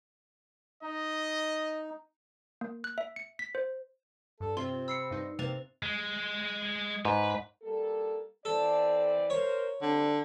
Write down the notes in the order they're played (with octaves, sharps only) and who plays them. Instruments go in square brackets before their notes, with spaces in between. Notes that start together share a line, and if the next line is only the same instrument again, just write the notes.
[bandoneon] D#4 [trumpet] D#5
[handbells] A#3
F#6
E5
C#7
B6
C5
[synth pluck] G2 [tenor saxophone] A4
[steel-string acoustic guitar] C3 [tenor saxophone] C4 [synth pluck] F4 E5 E6 [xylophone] C6
[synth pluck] B5 [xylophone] E6 C7 C#7
[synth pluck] G2 D#4 C6
[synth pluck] C3 [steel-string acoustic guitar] A#3 [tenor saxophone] C4 [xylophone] B4 A6 F7
[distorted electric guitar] G#3
[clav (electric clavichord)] G#2 [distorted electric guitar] B4
[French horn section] G3 A#3 A4
[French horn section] E3 C4 D5 [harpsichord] A4
[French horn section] A#4 C5 [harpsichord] C#5
[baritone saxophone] D3 [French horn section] G3 C4